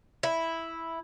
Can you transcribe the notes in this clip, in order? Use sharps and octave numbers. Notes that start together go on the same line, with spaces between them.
E4